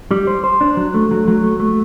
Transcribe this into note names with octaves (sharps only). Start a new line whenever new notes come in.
G3
C5
C5
D4
F#3
A3
F#3
F#3
A3
A3